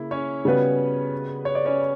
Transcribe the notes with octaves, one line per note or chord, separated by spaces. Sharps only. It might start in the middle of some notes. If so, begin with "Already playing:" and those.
Already playing: C#3 A#3 E4
C#4 C#5
C#3 G3 B3 F#4 B4
C#5
D5
C#4 C#5